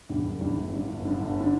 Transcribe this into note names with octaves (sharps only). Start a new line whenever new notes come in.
E2 D3 G3
F#1
E2 D3 G3
G1
G2 D3
G1
G2 D3
G1
D3